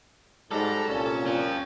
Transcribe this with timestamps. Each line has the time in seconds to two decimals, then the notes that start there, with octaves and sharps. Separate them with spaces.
0.51 G#2 F#3 G3 A4 A#5
0.89 C2 A#2 C#4
1.27 C4 F4